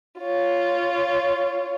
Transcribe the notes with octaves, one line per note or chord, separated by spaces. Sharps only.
F4 C#5